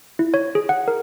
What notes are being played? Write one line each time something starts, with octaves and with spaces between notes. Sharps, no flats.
E4
C#5
G#4
F#5
A#4